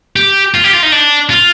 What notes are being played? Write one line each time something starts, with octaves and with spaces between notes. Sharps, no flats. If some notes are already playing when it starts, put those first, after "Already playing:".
G4
F4
G4
F4
D#4
D4
F4